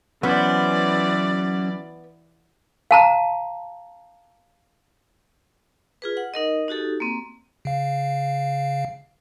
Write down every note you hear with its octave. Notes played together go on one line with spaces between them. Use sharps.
E3 F#3 B3 C#4 C5 D5
F5 A5 A#5
F4 G#4 B4
F#5
D#4 A#4 D#5
D#4 F#4 G4 A4
A#3 C4
C#3 F5